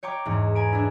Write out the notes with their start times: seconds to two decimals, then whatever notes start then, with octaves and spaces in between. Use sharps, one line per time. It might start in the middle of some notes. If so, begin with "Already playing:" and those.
0.03 C#5 G5 A#5 D6
0.25 E2 G#2
0.55 G#5 A#5 B5 D7
0.73 D4 E4